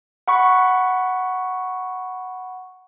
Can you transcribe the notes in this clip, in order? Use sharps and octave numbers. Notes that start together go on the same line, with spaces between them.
F#5 B5 C#6